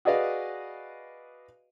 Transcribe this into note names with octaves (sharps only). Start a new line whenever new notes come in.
F#4 G#4 B4 D5 D#5 F5